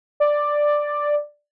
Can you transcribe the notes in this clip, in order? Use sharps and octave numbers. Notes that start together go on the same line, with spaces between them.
D5